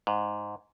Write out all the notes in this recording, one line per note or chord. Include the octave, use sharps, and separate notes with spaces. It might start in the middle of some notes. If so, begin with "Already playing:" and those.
G#2